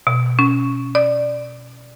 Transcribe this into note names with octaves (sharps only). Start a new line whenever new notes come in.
B2
C#4
D5